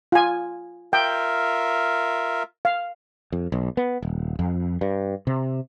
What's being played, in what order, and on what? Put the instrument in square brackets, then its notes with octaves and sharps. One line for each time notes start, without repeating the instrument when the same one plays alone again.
[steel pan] F4 G#5
[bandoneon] F4 A#4 E5 [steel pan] G5
[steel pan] F5
[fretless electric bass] F2
B1
B3
D#1
F2
G2
C3